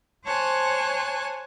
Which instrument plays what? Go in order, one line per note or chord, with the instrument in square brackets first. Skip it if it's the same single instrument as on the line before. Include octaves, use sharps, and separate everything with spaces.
[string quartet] C5 C#5 G#5 A5 F#6